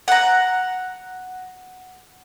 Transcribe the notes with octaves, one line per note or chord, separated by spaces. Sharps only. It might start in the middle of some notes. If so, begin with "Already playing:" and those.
F#5 A#5